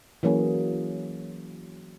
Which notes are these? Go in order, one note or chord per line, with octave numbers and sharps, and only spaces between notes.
E3 F#3 A#3 C#4 G#4